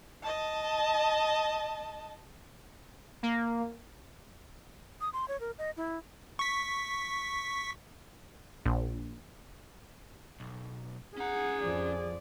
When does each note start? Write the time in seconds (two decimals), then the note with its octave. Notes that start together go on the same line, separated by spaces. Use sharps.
0.23 D#5 A5
3.23 A#3
5.01 D#6
5.13 C6
5.28 C#5
5.40 A#4
5.58 D#5
5.77 E4
6.39 C#6 B6
8.66 A#1
10.40 B1
11.18 C#4 G#4 F#5 A#5
11.63 F2 F3 D5